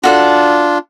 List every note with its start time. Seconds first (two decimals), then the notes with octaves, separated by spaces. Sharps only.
0.04 D4 F4 F#4 A4 D5